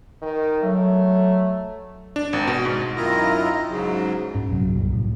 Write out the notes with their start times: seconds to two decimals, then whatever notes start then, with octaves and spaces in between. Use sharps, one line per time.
0.22 D#3
0.63 F#3 A3
2.16 D4
2.33 G#1
2.47 B2
2.65 G#2
2.96 F#2 D#3 E4 F4 D#5 A#5
3.69 G#2 C#3 F#3
4.35 G#2 C#4
4.51 A#1 F#2 C3 F#3
4.75 C2 G2 A#2 F#3
4.92 A2